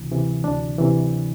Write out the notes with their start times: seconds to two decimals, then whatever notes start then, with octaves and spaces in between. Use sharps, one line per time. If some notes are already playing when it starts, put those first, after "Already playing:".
Already playing: D2 C3 E3
0.11 C3 E3
0.44 D2 D4
0.78 C3 E3